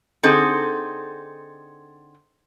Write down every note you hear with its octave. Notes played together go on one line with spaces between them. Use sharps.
D3 C4 D#4 G#4 A4